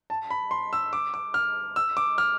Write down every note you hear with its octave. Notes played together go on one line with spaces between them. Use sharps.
A5
B5
C6
E6
D6
D6
F6
E6
D6
F6